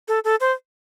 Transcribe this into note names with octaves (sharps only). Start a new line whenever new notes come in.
A4
A4
C5